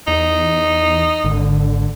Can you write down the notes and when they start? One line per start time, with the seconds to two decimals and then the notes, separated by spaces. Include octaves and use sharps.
0.08 E2 D#4
1.24 G#1 D3